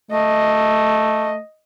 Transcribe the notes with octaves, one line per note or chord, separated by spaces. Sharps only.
A3 D#5